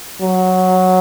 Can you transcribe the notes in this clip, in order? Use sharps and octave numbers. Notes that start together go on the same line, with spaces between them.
F#3